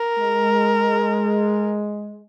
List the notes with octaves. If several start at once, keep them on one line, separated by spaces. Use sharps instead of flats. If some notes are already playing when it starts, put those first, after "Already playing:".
Already playing: A#4
G#3